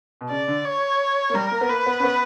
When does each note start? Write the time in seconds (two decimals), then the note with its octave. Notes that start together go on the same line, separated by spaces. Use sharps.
0.21 B2
0.30 C#3 D5
0.48 D3
0.65 C#5
1.30 A#3
1.34 G3 A#4
1.51 A#3
1.61 B3
1.69 A#3 B4
1.86 B3
2.00 C#4
2.03 B3